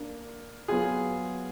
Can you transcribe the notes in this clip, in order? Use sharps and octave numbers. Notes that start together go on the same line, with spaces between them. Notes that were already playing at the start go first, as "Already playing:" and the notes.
Already playing: A#3 D4
F#3 B3 F4 G#4